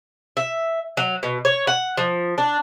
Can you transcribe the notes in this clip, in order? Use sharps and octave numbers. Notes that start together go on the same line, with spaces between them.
E5
F#3
B2
C#5
F#5
F3
D4